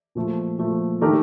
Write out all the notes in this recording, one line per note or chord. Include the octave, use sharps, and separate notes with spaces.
A#2 F3 A3
A#2 F3 A3
D#3 A3 D4 G4 A#4